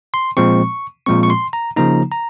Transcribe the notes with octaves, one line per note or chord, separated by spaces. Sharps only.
C6
A#2 F3 G#3 C4 C#6
A#2 F3 G#3 C4 C#6
C#6
C6
A#5
C#3 F3 A#3 D#4 A#5
A#5